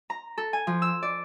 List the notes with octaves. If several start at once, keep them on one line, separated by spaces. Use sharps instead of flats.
A#5
A4
G#5
F3
E6
D5